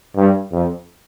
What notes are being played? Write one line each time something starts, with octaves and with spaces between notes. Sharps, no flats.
G2
F2